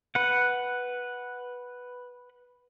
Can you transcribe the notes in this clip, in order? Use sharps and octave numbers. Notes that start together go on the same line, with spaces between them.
B4 F#5